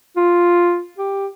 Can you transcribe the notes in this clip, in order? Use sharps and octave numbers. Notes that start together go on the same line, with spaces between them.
F4
G4